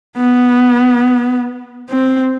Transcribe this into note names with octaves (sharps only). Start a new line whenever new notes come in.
B3
C4